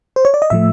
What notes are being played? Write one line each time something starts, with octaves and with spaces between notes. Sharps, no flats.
C5
C#5
D5
D#5
A2 F3 A3 E5